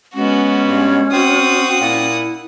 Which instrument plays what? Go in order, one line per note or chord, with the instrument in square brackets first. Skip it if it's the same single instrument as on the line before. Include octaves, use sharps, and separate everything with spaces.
[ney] G#3 [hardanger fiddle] B3 F#4 [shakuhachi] C#4
[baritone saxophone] G2
[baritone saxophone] C4 [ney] F#4 [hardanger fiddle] F#5 D#6
[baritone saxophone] A#2 [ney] E4